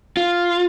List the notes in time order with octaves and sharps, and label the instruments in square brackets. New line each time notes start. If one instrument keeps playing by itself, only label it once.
[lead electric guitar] F4